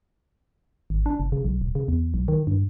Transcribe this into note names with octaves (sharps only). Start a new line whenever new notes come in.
G#1
D4
F#1
C#3
B1
D#1
C#3
E2
B1
D#3
G2